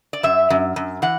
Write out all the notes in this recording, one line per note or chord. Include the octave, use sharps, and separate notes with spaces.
D5
F#2 E5
F#2
F#2
E3 F#5